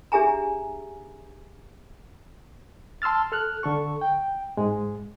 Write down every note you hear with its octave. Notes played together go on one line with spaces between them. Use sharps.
D4 G4 G#4 E5 G#5 A#5
A5 C6 E6 F6 A6
A4 F6 F#6
D3 A4 C#6
G5
G#2 G#3